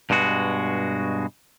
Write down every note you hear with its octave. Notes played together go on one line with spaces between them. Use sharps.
G2 B2 G#3 F#4